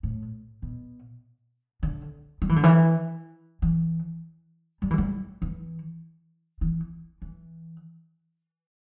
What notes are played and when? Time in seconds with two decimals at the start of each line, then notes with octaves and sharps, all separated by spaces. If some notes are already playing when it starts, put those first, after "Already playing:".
0.03 A2
0.62 B2
1.83 D3
2.42 G3
2.49 E3
2.56 D3
2.63 E3
3.62 E3
4.82 G3
4.91 E3
4.98 G3
5.42 E3
6.61 E3
7.22 E3